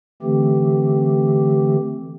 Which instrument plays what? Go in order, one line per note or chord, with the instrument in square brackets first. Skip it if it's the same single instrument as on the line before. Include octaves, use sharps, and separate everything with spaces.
[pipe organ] D3 E3 A3 C4 G4